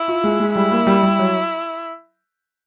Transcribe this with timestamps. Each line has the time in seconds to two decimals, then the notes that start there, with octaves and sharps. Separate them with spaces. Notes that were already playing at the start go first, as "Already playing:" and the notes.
Already playing: E4
0.08 F4
0.24 G#3
0.40 G#3
0.55 G3 E4
0.71 A#3
0.87 G3
1.03 G3
1.19 F#3